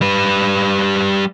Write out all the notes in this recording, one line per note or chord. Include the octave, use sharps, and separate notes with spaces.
G3 B4